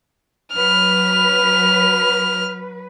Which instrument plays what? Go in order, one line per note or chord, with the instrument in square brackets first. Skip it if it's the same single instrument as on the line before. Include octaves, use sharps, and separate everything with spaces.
[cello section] F#3 B4 [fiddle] F6